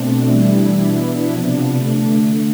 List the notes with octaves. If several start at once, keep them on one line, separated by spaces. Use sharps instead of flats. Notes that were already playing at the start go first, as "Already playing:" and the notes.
Already playing: B2 A3 C4 D4
E3 G3 D4 E4
B2 B3 D4
C3 F3 B3 D4
D3 A3 D4